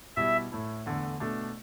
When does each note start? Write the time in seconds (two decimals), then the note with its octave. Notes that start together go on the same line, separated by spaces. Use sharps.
0.16 B2 G3 E4 E5
0.51 A2 A3 E4
0.86 E2 D3 A3
1.20 B2 A3 D4